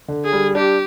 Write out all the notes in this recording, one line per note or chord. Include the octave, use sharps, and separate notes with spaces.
D3
G#4
G3
D4 G4